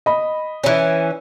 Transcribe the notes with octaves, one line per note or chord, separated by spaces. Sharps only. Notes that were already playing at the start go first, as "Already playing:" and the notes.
D#5 B5
E3 C#4